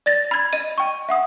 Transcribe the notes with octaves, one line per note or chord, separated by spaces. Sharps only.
D5 A6 A#6
B5 G#6
D#5 D#7
G5 C#6
E5 F#5 D#6